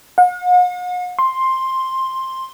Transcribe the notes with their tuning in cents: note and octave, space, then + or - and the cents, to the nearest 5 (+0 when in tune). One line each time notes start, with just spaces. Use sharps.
F#5 -45
C6 +10